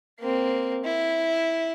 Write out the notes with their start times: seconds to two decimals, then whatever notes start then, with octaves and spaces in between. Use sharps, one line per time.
0.20 A#3 C4
0.84 E4